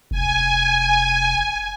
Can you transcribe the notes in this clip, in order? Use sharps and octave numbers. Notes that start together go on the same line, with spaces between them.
F1 G#5